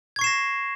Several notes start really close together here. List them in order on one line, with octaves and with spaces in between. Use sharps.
G#6 C#6 C7 E7 A#6